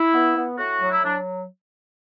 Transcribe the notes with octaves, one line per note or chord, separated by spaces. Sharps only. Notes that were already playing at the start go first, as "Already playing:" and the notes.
Already playing: E4
B3
B3
A2 F#4
F#3
E4
F#3 D4